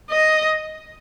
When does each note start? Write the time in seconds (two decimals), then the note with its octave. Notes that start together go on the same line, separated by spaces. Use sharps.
0.11 D#5